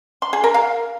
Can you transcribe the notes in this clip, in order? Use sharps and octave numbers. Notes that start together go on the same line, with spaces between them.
C6
G#4
A#4
F5